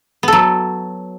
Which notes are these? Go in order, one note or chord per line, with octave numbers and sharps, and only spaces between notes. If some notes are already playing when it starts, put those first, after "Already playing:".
F#3 B3 A4